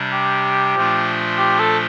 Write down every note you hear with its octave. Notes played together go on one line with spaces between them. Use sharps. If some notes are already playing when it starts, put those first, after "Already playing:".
Already playing: C3 G3 D4
G4
A#2 F3 A3 D4 F4
G4
A4